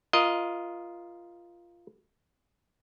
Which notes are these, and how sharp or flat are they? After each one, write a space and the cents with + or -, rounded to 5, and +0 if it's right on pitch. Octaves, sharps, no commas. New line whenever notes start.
F4 -10 A#4 +15 D#5 +0